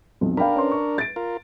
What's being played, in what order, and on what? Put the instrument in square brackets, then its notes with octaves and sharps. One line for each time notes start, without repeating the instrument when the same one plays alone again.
[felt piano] B1 F2
[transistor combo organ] D4 A#4 [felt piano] F5 G5 B5
[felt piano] C#4 B4 C6
C#6
A6 D7
[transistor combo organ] F4 A#4